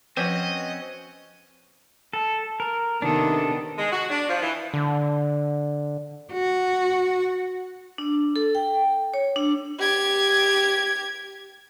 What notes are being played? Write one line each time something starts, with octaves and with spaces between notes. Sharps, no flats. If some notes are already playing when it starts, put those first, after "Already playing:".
F3 C4 C#4 F#4 B4 D#5
A4
A#4
C3 D#3 B3 D4 A4
G#3
F#4
D4
F3
E3
D3
F#4
D4
A4
G5
C#5
D4
G4 G#6